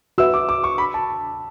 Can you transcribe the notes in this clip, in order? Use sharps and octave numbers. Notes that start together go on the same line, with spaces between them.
F#4 B4 E5 E6
D6
D6
C#6
B5
A5